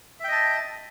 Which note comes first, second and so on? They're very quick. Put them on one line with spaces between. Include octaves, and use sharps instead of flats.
E5 G5 D#5 A5